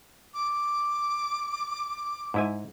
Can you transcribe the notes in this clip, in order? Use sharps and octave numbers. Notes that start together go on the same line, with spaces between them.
D6
G#2 E4 G#5